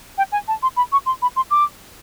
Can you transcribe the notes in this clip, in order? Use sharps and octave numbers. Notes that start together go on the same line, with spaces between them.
G5
G#5
A5
C6
B5
C#6
C6
B5
C6
D6